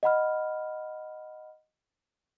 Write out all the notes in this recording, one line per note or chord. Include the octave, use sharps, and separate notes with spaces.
D#5 F#5 B5 F6